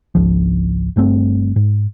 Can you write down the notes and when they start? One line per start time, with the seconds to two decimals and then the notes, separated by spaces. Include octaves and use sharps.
0.15 G#1 C#2 F3
0.96 G1 G2 A3 C4
1.56 G#2